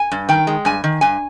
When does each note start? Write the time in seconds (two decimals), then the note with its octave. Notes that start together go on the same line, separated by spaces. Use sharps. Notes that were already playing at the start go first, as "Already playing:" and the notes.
Already playing: G#5
0.12 G2
0.29 D#3 G5
0.47 G#3
0.65 G2 G#5
0.84 D#3
1.01 G2 G#5